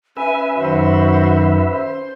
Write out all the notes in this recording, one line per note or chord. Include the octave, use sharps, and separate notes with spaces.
C#4 B4 E5 G#5
F#2 D#3 F#4 C5
C5